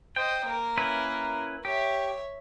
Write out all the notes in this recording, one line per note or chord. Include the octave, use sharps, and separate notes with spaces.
C5 D#5 G5
A#3 A#4
C#4 E4 B4
G4 C#5 E5